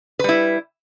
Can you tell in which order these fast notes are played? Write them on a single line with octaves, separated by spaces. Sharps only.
B4 G3 E4